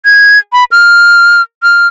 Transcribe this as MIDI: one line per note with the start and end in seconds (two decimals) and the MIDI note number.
0.05 0.38 92
0.53 0.64 83
0.72 1.42 89
1.63 1.87 89